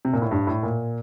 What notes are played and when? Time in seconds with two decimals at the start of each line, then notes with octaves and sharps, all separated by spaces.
0.05 C3
0.13 A#2
0.22 A2
0.31 G2
0.47 A2
0.63 A#2